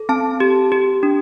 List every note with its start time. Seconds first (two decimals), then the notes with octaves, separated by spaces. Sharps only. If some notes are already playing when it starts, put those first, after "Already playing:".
Already playing: A4
0.09 C4 A5
0.40 G4
0.72 G4
1.03 D4